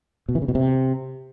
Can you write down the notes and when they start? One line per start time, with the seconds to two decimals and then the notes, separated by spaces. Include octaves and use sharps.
0.29 B2
0.35 E3
0.42 C#3
0.48 B2
0.55 C3